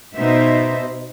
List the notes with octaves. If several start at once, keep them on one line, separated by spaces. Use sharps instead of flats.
B2 D#4 C5 E5